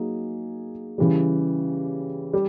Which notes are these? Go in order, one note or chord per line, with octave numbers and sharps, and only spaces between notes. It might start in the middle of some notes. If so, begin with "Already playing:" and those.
Already playing: F#3 A#3 D#4 G#4
C#3 E3 G3
G3